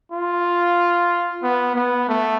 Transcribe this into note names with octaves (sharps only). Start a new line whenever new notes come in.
F4
B3
B3
A3